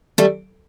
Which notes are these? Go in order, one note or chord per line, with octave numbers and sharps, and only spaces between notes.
G3 A3